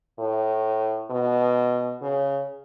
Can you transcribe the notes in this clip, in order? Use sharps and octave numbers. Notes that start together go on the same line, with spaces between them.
A2
B2
C#3